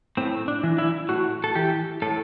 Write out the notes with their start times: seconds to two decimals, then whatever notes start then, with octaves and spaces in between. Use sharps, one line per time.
0.17 A2 C4
0.48 D4
0.63 E3
0.78 E4
1.09 A2 F#4
1.44 A4
1.55 E3 G4
2.02 A2 A4